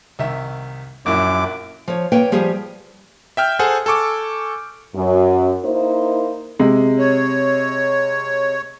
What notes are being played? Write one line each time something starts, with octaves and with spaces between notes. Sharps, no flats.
C2 D#3 E5
A#1 F#2 E4 D6
F3 C#5
A#3 B4 C#5 G5
F3 G3 G4 G#4
E5 G5 F6 G6
G#4 A4 C5 F#5 G#5
A4 G#5 C#6 D6
F#2
A#3 D#4 E4 C5
C3 G#3
C#5